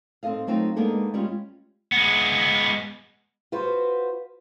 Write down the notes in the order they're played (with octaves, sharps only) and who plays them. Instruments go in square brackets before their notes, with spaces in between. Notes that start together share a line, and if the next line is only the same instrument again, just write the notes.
[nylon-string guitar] C4 D#4 A4 D#5 F5
F#3 A3 C4 D#4 F4
G#3 A#3 B3 D4 D#4 A4
G3 G#3 C#4 F4
[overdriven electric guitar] G#3 B3
[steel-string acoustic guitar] F4 F#4 B4 C5